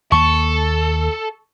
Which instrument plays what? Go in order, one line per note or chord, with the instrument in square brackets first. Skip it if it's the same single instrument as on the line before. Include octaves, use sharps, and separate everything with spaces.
[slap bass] D#2 A#3 [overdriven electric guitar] A4 [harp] C#6